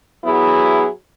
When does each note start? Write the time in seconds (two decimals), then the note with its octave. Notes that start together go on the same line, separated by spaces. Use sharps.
0.23 F#3 B3 E4 G#4